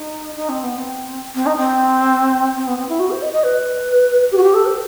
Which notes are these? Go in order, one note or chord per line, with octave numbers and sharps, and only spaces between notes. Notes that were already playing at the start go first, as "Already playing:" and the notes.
Already playing: D#4
D#4
C4
B3
C4
C4
D#4
C4
C4
B3
C4
E4
F#4
C5
D#5
D#5
B4
G4
F#4
G4
A4
C5